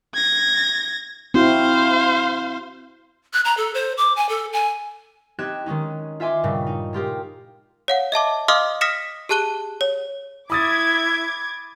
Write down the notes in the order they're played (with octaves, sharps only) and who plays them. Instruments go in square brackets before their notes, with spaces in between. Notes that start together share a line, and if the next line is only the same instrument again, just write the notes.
[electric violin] G#6 A#6
[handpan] C4 E4 F#4 [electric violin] C5 F5
[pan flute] F#6
A#5
A4
C5
D6
G#5
A4
G#5
[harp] C4 D#4 G4 F#6 G#6 E7
D#3 G#3 C#4 D#4
F4 E5 G#5 C6 D6
G2 A#2 C#3 G3
D#4
G#3 F4 G4 A#4
[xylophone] C#5 F5 F#5
D#5 E5 A5 D6
D#5 F5 C6 D6 D#6 F6
D#6 F6 A#6 B6 C#7 E7
G4 G#4 A5 F#6 D#7 G7
C#5
[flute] E4 [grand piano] B5 D#6 A6 [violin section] D6 G#6